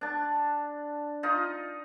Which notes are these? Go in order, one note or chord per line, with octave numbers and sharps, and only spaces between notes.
D4 A5
D#4 F4 D#5